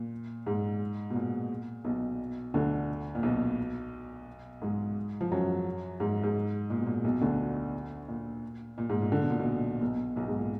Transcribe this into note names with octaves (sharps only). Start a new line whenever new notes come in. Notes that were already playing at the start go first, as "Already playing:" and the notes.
Already playing: A#2
G#2
B2
A#2
B1 B2
D2 D3
A#2
B1 B2
G#2 G#3
F3
F#2 F#3
G#2
G#2
A#2
B2
A#2
B1 B2
D2 D3
A#2
A#2
G#2
A#2
D3
B2
A#2
B1 B2
B1 B2
B1 B2
G#2
A#2